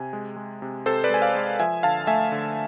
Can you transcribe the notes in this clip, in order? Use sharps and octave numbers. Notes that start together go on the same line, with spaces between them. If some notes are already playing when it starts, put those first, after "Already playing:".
Already playing: C3 G#5
G#3
G#3
C3
C3 A4 C5
B4 D5
G#3 G#5
D5 F5
G#3
F3 E5 G#5
D3 F5 A5
A3 E5 G#5
D3